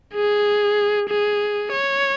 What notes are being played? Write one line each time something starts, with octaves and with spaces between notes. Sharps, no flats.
G#4
G#4
C#5